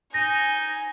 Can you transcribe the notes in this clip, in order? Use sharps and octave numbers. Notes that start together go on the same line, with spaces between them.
D#4 G#5 A#6